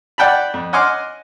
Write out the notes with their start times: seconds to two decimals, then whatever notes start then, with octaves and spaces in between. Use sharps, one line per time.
0.18 D5 F#5 G5 A5 B5
0.54 F2
0.73 D#5 F#5 G#5 C6 D6 F6